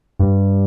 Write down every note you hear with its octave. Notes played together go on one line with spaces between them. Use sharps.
G2